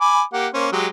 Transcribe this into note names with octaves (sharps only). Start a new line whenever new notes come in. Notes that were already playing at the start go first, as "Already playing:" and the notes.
G#5 B5 D6
A#3 G4 F#5
A#3 C#4 C5
F#3 G#3 G4